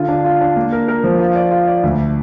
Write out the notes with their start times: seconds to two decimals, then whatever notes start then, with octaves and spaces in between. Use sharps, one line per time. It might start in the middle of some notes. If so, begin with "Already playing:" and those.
Already playing: D3 F4
0.08 D4
0.24 F4
0.41 D4
0.56 A#3
0.72 A#4
0.88 A#4
1.04 F3
1.19 F4
1.36 D5
1.51 F4
1.67 D5
1.83 D2